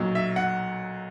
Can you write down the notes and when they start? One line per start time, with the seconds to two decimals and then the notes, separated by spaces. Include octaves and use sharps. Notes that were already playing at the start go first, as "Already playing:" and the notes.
Already playing: B1 A#2 F#3
0.15 E5
0.36 F#5